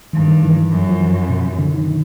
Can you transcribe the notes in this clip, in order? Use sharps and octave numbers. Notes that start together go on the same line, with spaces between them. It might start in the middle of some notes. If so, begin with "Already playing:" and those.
G2 D#3
D#3
E3
E3
F#2
F3
E3
B2
C3
D3
D#3